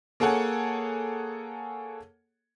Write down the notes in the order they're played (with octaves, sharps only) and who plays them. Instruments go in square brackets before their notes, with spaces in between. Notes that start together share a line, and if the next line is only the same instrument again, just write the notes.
[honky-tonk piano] A#3 G#4 A4 C#5 F#5 G#5